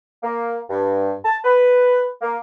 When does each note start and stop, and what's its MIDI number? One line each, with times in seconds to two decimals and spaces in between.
0.24 0.57 58
0.69 1.13 43
1.25 1.37 81
1.45 2.08 71
2.22 2.36 58